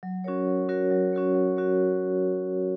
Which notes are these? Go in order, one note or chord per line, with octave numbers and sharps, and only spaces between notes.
F#3
C#4 F#4 A#4 C#5
F#3
C#4 F#4 A#4 C#5
F#3
C#4 F#4 A#4 C#5
F#3
C#4 F#4 A#4 C#5